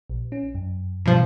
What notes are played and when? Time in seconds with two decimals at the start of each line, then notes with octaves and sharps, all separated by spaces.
0.10 A#1
0.32 C#4
0.55 F#2
1.06 G2 B2 E3 F3